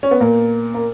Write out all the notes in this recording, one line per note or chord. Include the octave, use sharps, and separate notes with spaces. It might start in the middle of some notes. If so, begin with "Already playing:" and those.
C#4
B3
A#2 A#3
A#3